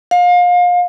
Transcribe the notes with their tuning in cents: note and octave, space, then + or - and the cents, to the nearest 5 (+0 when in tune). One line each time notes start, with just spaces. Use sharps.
F5 +30